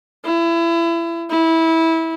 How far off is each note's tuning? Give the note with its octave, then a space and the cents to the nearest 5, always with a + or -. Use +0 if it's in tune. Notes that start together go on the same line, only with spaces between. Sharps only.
E4 +30
E4 -20